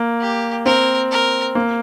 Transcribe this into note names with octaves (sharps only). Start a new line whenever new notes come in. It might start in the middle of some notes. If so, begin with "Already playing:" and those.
Already playing: A#3
G4
C4 A#4
A#4
A#3